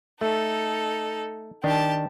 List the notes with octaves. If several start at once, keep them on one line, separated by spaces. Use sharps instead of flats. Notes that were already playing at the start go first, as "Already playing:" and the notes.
A3 D#4 A4
D#3 D4 G4 A5